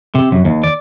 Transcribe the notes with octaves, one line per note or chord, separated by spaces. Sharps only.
C3
F#2
D#2
D5